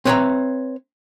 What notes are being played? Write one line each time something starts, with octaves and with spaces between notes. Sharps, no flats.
C4 B4 C#5 E5 A5 A#5